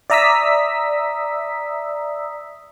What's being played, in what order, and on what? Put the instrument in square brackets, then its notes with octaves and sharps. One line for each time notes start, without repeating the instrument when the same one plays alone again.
[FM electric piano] D5 E5 A#5 D#6 E6 B6